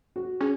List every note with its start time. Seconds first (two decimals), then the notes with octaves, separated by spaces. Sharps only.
0.16 F#4
0.40 C#4 G#4